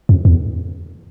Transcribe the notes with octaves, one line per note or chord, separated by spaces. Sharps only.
F2
E2